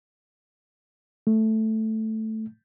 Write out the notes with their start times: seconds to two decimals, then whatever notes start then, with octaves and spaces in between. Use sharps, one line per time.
1.27 A3